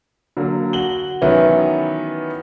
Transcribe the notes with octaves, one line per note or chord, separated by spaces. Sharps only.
D3 F#3 A#3
F#4 F#7 G7
D#3 E3 F#3 B3 C#4 E4